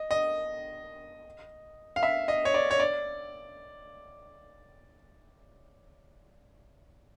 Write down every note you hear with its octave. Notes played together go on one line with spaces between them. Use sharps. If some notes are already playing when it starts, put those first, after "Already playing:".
Already playing: D#5
D#5
F5
E5
D#5
C#5
D5
C#5
D5